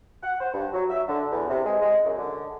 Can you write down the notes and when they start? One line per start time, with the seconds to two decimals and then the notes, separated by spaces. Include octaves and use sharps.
0.22 F#5
0.41 C5
0.54 G2
0.73 F#3
0.90 E5
1.09 D3
1.31 E2
1.49 C3
1.65 G#3
1.82 G#3
2.05 F#2
2.19 D3